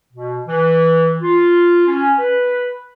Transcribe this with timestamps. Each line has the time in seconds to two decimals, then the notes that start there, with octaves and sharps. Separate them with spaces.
0.13 B2
0.47 E3
1.21 F4
1.87 C#4
2.19 B4